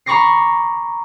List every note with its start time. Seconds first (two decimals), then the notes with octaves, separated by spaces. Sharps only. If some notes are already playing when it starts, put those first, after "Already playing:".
0.06 A#5 B5 C#6 D6 A#6 C7